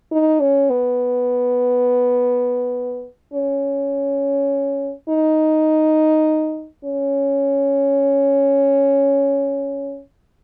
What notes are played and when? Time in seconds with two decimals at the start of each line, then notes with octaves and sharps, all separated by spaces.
0.12 D#4
0.40 C#4
0.70 B3
3.34 C#4
5.09 D#4
6.85 C#4